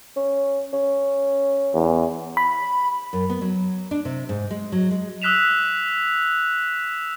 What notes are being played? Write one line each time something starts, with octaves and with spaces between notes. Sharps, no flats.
C#4
C#4
E2
B5
F#2
B3
F#3
D4
C3
G#2
G#3
F#3
G#3
D#6 E6 F#6 B6 E7 F7